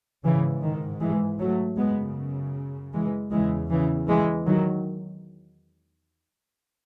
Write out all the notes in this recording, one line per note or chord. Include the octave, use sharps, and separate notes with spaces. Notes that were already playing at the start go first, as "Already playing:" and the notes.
G#2 C#3 E3
D#3
E3 G#3
F#3 A3
F#2 C#3 G#3 B3
E3 G#3
E2 C#3 E3 G#3
C#3 E3
E3 G#3
D#3 F#3